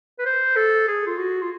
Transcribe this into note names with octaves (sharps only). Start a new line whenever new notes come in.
B4
C5
A4
G#4
F4
F#4
F4